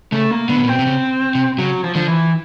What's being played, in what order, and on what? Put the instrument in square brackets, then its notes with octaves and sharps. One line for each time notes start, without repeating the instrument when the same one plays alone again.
[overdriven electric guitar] C#3 [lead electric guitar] A3
[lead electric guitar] A#3
[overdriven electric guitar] D3 [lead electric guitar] B3
[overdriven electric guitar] A2
A#2
[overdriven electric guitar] B2 [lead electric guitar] C4
[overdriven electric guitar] C3
C#3
C3
[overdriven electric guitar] C#3 [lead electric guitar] F#3
[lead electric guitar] F3
[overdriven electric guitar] D3 [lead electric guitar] F3
[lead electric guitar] E3